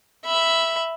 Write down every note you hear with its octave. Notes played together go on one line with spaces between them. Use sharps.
E5 B5